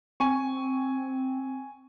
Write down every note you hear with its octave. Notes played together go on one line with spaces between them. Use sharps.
C4 G#5 C#6